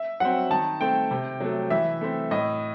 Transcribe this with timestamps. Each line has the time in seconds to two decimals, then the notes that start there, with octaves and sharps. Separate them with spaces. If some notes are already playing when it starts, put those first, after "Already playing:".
Already playing: E5
0.20 F#3 C4 F#5
0.51 D#3 A5
0.81 A3 C4 G5
1.11 C3
1.40 F#3 A3
1.70 E3 E5
2.01 A3 C4
2.31 A2 D#5